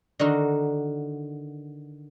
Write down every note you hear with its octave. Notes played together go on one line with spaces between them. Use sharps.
D3 D#3 D#4 F#4 A#4